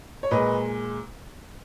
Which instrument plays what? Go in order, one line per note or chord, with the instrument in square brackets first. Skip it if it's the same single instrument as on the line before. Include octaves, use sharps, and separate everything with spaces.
[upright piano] C#5
A#2 G#3 B4 D#5